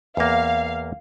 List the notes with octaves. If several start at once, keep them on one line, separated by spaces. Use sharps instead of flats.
E2 A#3 F5